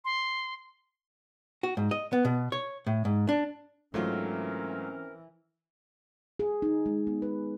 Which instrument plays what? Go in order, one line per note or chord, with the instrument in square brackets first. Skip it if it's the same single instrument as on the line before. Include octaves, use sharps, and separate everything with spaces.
[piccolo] C6
[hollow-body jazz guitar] F#4
G#2
D#5
B3
B2
C#5
A2
G#2
D4
[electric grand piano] G#2 F#3 [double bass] E3 [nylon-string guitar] A3 F4 [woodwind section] C4 C#4 A#4
[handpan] G#4
D#4
G#3
B3
B4